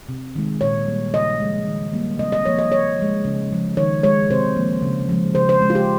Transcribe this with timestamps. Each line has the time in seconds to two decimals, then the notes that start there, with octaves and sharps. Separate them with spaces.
0.09 C3
0.36 D#3 G#3
0.61 A#2 C#5
0.88 G3 A#3
1.13 C#3 D#5
1.40 F3 G#3
1.67 D#3
1.93 G3 A#3
2.19 C3 D#5
2.32 D#5
2.45 F3 A#3 C#5
2.59 D#5
2.72 C#3 C#5
2.98 F3 G#3
3.25 C#3
3.51 F3 G#3
3.77 D#3 C#5
4.03 G#3 C#5
4.30 C3 C5
4.56 F3 A#3
4.82 C#3
5.09 F3 G#3
5.35 C#3 C5
5.49 C5
5.62 G#3
5.70 F4
5.75 G4